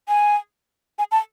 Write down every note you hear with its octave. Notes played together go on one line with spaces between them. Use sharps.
G#5
G#5
A5